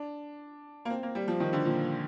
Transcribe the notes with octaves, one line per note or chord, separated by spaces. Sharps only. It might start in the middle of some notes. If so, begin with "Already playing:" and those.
Already playing: D4
A#3
C4
A#3
G3
F3
D#3
D3
A#2